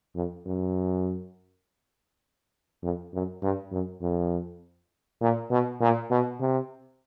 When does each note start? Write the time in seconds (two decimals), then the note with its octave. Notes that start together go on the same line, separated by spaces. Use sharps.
0.15 F2
0.46 F#2
2.83 F2
3.14 F#2
3.42 G2
3.72 F#2
4.02 F2
5.21 A#2
5.51 B2
5.81 A#2
6.11 B2
6.40 C3